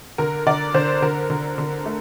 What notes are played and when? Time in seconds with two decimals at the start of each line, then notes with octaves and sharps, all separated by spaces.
0.18 D3 A#4
0.46 D3 D5
0.74 D3 C5
1.02 D3 A#4
1.30 D3
1.58 D3
1.86 A3